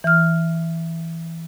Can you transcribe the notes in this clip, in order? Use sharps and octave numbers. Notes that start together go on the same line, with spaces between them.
E3 F6